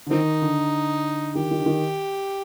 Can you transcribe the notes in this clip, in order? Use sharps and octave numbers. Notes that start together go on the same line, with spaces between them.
D3
D#3 C4 D#4
D3
D#3 G4
D#3
D3
D#3